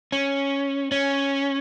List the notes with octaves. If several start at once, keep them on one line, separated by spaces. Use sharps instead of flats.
C#4
C#4